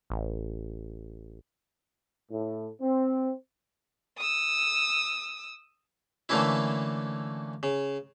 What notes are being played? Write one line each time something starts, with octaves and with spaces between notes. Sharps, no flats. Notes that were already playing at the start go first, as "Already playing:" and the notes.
A1
A2
C4
D#6 E6
D3 E3 A3 A#3 C#4 E4
C#3